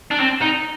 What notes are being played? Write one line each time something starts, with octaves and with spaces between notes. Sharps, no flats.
D4
C4
D#4